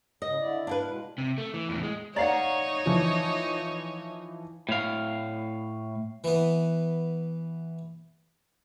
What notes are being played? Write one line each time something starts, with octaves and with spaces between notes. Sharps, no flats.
C#3 D#5
D3 E4 D5
D4 E4 B4 F5
B2 G#3
C3
A3
E3
E2 A2
G#3
D#4 C#5 D5 F5 F#5 A#5
E3 F3
A2 F5
E3 B3